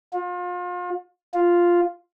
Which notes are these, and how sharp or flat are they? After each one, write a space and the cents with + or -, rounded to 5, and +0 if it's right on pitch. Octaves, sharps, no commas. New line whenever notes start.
F4 +35
F4 +0